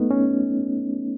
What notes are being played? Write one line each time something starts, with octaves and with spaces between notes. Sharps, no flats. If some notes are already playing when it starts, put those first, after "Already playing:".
Already playing: A3 B3 D#4
C#4